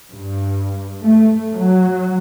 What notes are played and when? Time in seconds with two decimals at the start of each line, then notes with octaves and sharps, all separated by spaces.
0.13 G2
1.02 A3
1.55 F#3